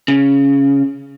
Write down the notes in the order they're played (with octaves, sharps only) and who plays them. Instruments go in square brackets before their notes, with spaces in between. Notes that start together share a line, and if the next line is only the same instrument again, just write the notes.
[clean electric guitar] C#3